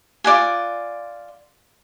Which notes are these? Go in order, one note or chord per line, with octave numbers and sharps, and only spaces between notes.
F4 D5 F#5 G#5